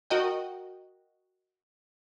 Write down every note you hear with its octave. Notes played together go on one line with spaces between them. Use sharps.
F#4 A#4 D#5 G5